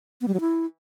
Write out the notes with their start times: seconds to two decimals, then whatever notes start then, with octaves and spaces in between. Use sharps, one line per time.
0.21 B3
0.28 G3
0.34 F#3
0.40 E4